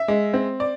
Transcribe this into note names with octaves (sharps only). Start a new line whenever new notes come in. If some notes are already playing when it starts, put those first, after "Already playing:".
Already playing: E5
G#3
C4
D5